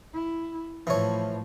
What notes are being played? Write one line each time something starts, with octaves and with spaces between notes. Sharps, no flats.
E4
A2 E3 F3 C#5